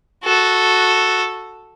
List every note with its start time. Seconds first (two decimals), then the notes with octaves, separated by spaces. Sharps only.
0.24 F#4 A4